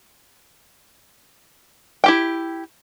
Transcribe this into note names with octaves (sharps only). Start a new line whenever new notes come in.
E4 G4 G5